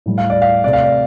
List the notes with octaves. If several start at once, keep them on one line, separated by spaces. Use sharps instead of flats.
A2 G3
F5
D5
F5
C3 A3 D5
F5
D5